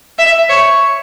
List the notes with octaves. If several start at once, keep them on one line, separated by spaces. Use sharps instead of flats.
E5
C#5